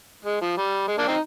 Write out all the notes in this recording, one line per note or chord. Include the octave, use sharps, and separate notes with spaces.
G#3
F3
G3
G#3
A#3 D4
C4 D#4